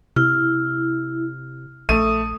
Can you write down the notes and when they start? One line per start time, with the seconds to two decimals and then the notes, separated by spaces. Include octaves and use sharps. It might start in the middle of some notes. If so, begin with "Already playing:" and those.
0.16 C3 E4 F6
1.89 A#1 A3 D#6 D#7